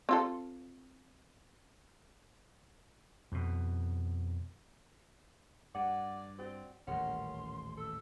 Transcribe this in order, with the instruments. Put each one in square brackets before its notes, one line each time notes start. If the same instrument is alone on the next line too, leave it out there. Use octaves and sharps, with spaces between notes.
[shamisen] C4 F4 A4
[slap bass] F2 B2
[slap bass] G2 [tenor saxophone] D5 [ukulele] F#5
[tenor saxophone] C4 [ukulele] F#4 D5 G5
[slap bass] D#1 A1 [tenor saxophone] C#4 [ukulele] A#4 F#5 [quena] C6
[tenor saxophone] A4 [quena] E6